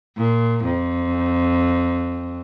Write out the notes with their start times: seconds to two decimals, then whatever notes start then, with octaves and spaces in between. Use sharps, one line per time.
0.18 A#2
0.65 F2